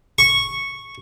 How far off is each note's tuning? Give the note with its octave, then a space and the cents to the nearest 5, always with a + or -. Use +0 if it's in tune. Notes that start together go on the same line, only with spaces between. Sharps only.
C#6 -5